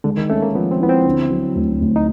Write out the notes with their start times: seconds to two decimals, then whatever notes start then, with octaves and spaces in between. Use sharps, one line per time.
0.04 D3 G#3
0.17 D#3
0.30 A3 C#4
0.42 A#3
0.55 F3 B3
0.71 C4
0.80 B3 E4
0.89 C4
1.06 D3
1.30 F#3
1.56 D2
1.81 D2
1.96 D#4